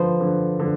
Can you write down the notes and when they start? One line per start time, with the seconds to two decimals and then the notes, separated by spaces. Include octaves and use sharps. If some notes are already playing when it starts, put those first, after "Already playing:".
Already playing: D3 F3 B4 C5
0.21 D3
0.60 D3